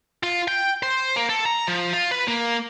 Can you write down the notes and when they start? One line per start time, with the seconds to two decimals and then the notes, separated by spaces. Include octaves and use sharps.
0.23 F4
0.48 G5
0.83 C5
1.16 A#3
1.30 A4
1.46 A#5
1.68 F3
1.93 F4
2.11 B4
2.28 A#3